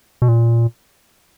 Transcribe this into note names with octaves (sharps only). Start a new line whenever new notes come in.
B2
A#2